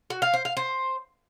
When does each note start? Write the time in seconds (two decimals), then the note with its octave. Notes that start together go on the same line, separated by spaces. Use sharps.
0.10 F#4
0.22 F5
0.34 C5
0.45 F5
0.57 C5